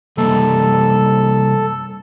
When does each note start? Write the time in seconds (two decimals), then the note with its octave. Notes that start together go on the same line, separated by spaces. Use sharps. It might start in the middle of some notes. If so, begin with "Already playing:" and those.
0.17 C3 G3 A#3 A4